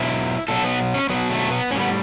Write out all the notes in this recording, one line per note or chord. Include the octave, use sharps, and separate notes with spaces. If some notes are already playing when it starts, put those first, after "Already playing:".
Already playing: B2 F#3 E4
B2 F#3 A4
B3
C#4
B2 F#3 B3
A3
B3
A2 G3 B3 C#4